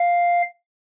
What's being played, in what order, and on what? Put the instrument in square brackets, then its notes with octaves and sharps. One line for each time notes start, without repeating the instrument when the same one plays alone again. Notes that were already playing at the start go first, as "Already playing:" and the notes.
Already playing: [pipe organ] F5